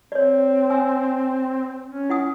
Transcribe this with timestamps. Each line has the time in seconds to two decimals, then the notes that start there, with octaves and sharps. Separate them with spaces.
0.12 C4 C#5 D5
0.70 G#5 E6
1.87 C#4
2.09 E4 F#5 D#6